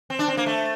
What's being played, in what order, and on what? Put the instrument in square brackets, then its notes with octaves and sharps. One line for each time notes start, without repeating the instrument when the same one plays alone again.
[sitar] C4
D4
C4
A#3
A3